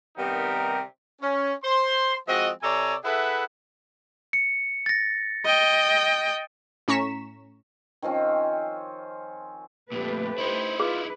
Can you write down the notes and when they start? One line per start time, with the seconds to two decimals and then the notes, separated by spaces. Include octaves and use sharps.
0.17 C3 D#3 G3 B3 D#4 A#4
1.22 C#4
1.64 C5 C6
2.28 F3 G#3 C4 F#4 D#5
2.62 C3 A4 C#5 D5 G#5 A#5
3.04 E4 G#4 A4 B4 E5 F#5
4.33 C#7
4.86 A6 A#6
5.45 D#5 G5
6.88 A2 C#4 A#5 C#6 B6 E7
8.02 D#3 F3 C4 C#4
9.92 F2 A#2 A3 G4 B4
10.38 D#4 E4 C5
10.80 F4 G#4 B4